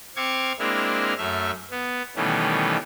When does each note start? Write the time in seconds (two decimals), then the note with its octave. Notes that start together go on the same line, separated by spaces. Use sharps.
0.16 C4 F5 C#6 D6 G#6
0.59 G#3 A#3 C4 D4 E4 F6
1.18 F#2 A3 E5 F6
1.71 B3
2.16 B2 D#3 E3 G3 A3 C#4